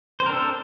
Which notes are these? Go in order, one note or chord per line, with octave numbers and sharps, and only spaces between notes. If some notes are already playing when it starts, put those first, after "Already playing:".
C4 D4 A4 A#4 C5